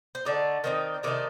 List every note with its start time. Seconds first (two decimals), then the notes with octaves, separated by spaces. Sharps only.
0.15 C5
0.25 D3 A3 D#4 D5
0.64 D#3 A3 C4 D#4
1.03 C3 D#3 A3 D#4 D5